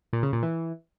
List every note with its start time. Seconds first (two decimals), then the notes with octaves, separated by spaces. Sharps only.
0.13 A#2
0.23 C#3
0.33 A#2
0.43 E3